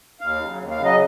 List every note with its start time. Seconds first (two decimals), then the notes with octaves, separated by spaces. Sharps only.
0.21 D#2 F5
0.39 C#3 F#3
0.59 D#2
0.71 F5
0.77 C#3 F#3
0.85 D#5